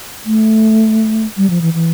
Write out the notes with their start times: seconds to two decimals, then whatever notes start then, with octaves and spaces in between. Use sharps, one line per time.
0.26 A3
1.37 G3
1.50 F3
1.62 E3
1.74 E3